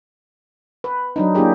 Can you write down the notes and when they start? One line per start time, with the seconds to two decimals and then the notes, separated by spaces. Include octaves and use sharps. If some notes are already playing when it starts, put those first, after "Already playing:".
0.84 B4
1.16 F#3 D4 D#4
1.35 A#3 D4 E4 G4 G#4